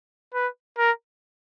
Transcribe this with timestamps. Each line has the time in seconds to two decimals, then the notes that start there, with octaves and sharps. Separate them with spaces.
0.34 B4
0.78 A#4